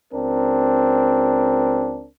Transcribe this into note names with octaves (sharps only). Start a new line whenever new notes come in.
C#2 C4 D4 A#4